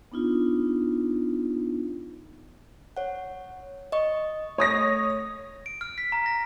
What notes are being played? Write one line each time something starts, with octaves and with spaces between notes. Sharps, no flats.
B3 D4 D#4 F4
C#5 F#5
D#5 C#6
A3 C#5 D#6 A#6
D7
F6
B6
A#5
A#6